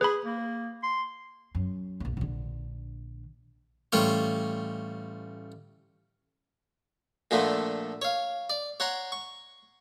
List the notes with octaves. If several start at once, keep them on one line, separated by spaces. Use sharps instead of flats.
G#4 B4 B5
A#3
C6
F#2
A#1 A#3
A#1 D3
A1 G3 A3 F4 C#5
A#2 D3 F3 A3
C#5 F5
D5
C#5 F#5 A#5 C6
C#6